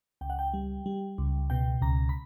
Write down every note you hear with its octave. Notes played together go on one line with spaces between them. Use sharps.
C#2 G5
F#5
G5
G3
G3
C#2
B2 G5
C#2 A#5
B5